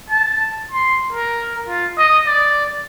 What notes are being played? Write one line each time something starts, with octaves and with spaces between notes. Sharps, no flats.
A5
C6
A#4
F4
D#5
D5